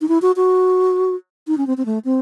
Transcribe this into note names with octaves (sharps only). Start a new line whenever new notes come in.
D#4
E4
F#4
F#4
D#4
C#4
C4
C4
A3
C4